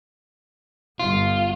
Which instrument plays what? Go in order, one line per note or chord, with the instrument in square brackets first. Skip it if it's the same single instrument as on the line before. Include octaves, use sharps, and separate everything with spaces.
[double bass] G1 [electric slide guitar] F4